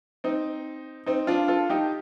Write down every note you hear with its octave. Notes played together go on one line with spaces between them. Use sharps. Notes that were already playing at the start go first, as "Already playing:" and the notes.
C4 D#4
C4 D#4
D4 F4
F4 A4
D#4 G4